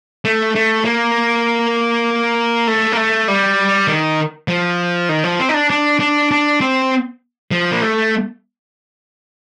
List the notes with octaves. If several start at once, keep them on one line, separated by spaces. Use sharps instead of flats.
A3
A3
A#3
A3
A#3
A3
G3
D#3
F3
D#3
F3
C4
D#4
D4
D4
D4
D4
C4
F3
A#3
A3